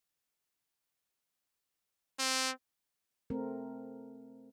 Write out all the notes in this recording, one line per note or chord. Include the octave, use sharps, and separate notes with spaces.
C4
A3 C4 A#4